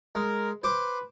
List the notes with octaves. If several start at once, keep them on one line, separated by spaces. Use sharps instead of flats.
G#3 A#4
B4 C5 D6